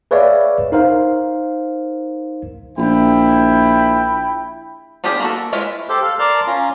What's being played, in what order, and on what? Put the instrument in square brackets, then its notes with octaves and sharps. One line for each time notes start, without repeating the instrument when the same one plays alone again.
[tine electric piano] G#4 B4 C#5 D5 E5 F5
D#4 A#4 C5 F5
[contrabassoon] A#1 [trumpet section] E4 G5 B5
[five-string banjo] B3 D4 F4 G4 G#4
A#3 F#4 A4
G#3 E4 F4 B4 C#5
[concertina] G4 A4 C5
A4 F5
A#4 D5 A5 C6 F6
C#4 F4 A#5